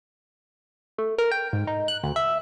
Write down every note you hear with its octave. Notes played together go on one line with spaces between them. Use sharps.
A3
A#4
G5
G#2
D#4
F#6
D2
E5